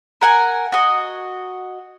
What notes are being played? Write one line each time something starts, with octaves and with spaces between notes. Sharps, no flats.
A#4 F#5 G#5
F#4 D#5